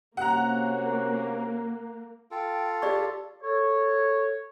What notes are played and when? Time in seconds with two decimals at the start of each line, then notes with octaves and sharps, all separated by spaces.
0.17 C3 A#3 C#4 F#4 F#5 A#5
2.31 F4 A4 G5
2.82 G4 G#4 D5 C#6
3.42 A4 C#5